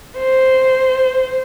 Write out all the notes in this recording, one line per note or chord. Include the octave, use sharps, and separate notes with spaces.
C5